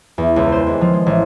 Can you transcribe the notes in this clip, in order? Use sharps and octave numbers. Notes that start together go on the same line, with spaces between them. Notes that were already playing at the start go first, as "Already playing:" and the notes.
E2
C#2
C5
D#2
F3
G#3
A1